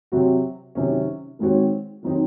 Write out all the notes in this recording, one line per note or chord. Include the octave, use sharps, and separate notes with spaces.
C3 F#3 C4 F#4
C3 D#3 F#3 C#4
D#3 G#3 C4 F#4 C#5
D#3 F#3 C4 D#4